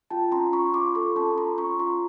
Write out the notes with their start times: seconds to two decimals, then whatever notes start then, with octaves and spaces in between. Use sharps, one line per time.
0.10 F4 G5 A5
0.32 C#4 A#5 C6
0.53 C#4 B5 C#6
0.74 F4 C6 D6
0.95 A4 B5 C#6
1.16 C#4 A5 B5
1.37 F4 A#5 C6
1.58 C#4 B5 C#6
1.79 F4 A#5 C6